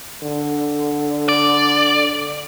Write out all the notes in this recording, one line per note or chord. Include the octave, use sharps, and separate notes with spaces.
D3
D5